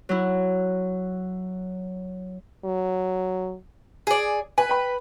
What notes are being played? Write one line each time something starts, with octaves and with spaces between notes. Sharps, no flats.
F#3 E4
F#3
G#4 D5
B4 G#5
G5 B5